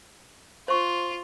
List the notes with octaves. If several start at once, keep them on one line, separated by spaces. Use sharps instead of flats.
F4 C5 C#6